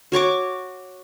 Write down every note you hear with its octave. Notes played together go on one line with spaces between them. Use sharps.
F#4 C#5 C#6 D6